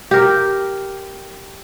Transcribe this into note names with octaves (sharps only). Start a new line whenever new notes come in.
G4 A#4